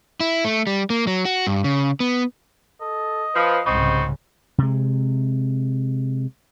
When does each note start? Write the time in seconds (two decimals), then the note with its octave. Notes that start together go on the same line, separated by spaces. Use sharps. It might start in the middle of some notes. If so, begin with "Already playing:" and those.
0.20 E4
0.44 A3
0.67 G3
0.90 A#3
1.07 F#3
1.25 F#4
1.47 G2
1.64 C#3
2.00 B3
2.81 A4 D#5
3.35 F3 B4
3.67 C2 G#2 C#3 B3 C4 D#4 C#6
4.58 C3 G#3